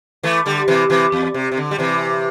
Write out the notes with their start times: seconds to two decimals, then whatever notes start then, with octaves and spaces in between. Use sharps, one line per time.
0.23 E3 A3
0.46 D3 G3
0.68 C3 E3
0.90 C3 E3
1.12 E2
1.34 C3
1.52 C3
1.57 D3
1.71 G3
1.78 C3 E3